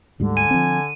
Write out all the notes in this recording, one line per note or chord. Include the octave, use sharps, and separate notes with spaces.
D2 G#2 D3 G3
G#5 D#7
F3 C4